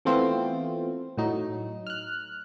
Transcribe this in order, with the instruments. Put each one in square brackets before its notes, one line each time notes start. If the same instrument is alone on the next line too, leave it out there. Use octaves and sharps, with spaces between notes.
[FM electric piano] E3 A3 B3 C4 F4
A2 F#3 D#4
F6 F#6